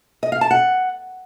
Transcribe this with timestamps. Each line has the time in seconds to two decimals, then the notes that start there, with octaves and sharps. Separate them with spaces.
0.23 D#5
0.32 F5
0.41 A5
0.51 F#5